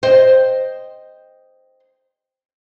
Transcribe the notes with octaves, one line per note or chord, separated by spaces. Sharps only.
C5 D#5 G5